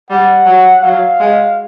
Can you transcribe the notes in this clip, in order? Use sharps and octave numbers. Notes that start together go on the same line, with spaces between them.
G3 F#5
F#3
F#3 F5
G#3